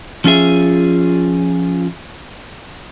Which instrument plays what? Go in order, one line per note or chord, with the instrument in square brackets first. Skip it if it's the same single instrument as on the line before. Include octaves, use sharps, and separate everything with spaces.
[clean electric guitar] F3 C#4 F4 G#4 E5